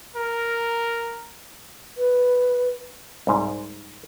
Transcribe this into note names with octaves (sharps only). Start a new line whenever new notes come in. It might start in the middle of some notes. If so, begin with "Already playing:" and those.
A#4
B4
C2 G#2